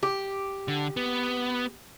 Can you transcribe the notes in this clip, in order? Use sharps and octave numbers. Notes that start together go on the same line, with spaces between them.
G4
D3
B3